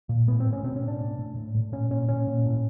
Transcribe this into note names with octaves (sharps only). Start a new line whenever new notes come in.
A#2
A2 B3
C4
A2
C#4
B2 C4
C#4
B2
D4
A2
A2
A2
A2
A#2 C#4
A#2 C#4
A#2 C#4
A#2
A2